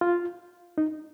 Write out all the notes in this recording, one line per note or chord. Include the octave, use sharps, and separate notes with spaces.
F4
D#4